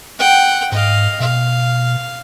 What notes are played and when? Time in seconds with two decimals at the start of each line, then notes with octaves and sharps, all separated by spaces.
0.19 F#5 G5
0.72 G#2 D#5 F5
1.20 B2 F5